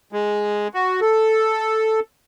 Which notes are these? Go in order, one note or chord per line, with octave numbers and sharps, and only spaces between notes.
G#3
F#4
A4